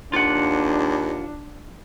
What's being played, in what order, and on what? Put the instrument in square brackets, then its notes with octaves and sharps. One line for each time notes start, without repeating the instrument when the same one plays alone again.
[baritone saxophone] D#2 [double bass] D4 [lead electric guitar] F4 F#5